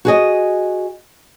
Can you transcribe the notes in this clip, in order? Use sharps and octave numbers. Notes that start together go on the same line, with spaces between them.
F#4 G#4 D#5